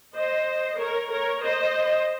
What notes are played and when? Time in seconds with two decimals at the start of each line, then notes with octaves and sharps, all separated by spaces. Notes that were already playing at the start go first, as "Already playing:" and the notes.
0.16 C5 D#5
0.80 A#4 C#5
1.11 A#4 C#5
1.43 C5 D#5